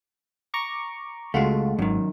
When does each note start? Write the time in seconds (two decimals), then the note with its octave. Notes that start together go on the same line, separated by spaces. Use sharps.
0.54 A#5 C#6 D6
1.34 C#2 G#3 A3 F4 F#4
1.79 G#1 F#2 D#3